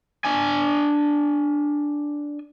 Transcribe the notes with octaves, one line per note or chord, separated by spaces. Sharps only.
D4 G#5